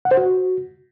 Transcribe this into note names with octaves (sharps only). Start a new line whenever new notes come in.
F#5
C5
F#4